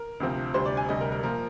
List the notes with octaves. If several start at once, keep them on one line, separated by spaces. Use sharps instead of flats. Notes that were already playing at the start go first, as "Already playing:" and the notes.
Already playing: A#4
D2 C3 F3 C4
D2 C3 G3 C5
D5
G#5
D2 C3 G3 D#5
A#4
A#4
A#2 F3 A#4